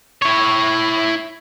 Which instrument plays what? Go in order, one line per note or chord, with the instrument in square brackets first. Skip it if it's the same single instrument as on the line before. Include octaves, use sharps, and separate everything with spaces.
[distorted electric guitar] E4 C#5